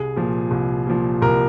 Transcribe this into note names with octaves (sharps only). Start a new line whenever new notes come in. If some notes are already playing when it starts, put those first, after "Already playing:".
Already playing: C2 G#4
A#2 F3
C2
A#2 F3
C2 A#4